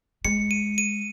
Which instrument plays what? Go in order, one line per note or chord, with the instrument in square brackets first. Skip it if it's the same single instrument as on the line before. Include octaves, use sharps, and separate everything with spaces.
[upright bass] G#3 [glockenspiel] C#7
[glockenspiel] D#7
D#7